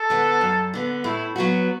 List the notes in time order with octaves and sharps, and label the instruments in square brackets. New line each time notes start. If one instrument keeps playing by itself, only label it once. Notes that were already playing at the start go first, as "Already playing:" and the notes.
Already playing: [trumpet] A4
[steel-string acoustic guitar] D3 B3
F#2
D3 B3
[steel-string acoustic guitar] A2 [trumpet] E4
[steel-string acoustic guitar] F#3 B3 F#4